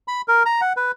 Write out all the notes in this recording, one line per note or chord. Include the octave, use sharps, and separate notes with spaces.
B5
A#4
A#5
F#5
B4